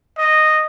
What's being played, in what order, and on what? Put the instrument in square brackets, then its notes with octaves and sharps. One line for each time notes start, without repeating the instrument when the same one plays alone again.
[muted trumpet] D#5